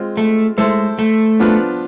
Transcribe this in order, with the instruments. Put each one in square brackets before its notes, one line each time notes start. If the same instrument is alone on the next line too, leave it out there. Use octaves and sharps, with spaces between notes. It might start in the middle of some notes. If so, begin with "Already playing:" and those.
Already playing: [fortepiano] G#3 C4 F4
[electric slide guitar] A3
[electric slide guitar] G#3 [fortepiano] A3 E4 A4 C5
[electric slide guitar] A3
[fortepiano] F3 B3 D4 F4 B4